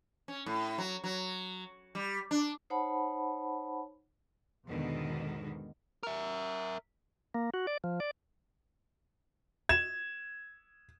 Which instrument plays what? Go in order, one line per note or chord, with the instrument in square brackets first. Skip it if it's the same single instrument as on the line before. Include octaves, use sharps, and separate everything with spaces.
[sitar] C#4
A2
F#3
F#3
G3
D4
[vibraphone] D#4 C5 C#5 F#5 A5 B5
[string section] E2 G#2 B2 D3 D#3
[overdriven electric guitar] A#4 E5
[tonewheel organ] A#3
F#4
D5
F3
D5
[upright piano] G#6 E7